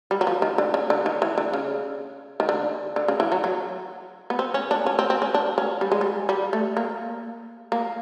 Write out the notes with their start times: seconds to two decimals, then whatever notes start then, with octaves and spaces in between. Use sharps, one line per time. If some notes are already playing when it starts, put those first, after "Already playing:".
0.11 G3
0.21 F#3
0.27 F3
0.42 D#3
0.58 D3
0.74 C#3
0.90 D3
1.06 D#3
1.22 E3
1.38 D3
1.53 C#3
2.40 D#3
2.49 D3
2.96 D3
3.08 C#3
3.20 E3
3.32 F#3
3.44 F#3
4.30 B3
4.39 C4
4.54 C#4
4.71 D4
4.86 C#4
4.99 C4
5.10 C4
5.22 C#4
5.34 D4
5.58 C#4
5.81 G3
5.92 G#3
6.01 G3
6.29 G3
6.53 A3
6.77 A#3
7.72 A#3